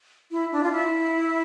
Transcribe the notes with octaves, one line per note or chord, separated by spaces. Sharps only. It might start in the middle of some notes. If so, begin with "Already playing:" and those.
E4
D4
F4
E4